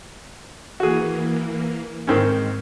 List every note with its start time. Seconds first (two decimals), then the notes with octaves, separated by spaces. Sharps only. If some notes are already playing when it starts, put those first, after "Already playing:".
0.80 E3 A#3 F#4 G#4
2.07 G#2 D#3 C4 C#4